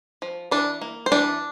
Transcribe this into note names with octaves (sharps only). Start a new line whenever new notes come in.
F3
E3 D4 D5
A#3
C5
E3 D4 D5